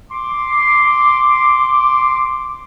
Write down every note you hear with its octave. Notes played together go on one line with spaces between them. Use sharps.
C6 D6